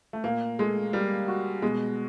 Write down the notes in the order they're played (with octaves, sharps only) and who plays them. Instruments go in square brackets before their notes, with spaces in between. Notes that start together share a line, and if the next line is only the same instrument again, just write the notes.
[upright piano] A3
[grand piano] A#2 [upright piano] A#3
[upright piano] G#3 [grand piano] A3
[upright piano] G3 [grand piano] A#3
[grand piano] F#4
[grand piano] B2 [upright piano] G#3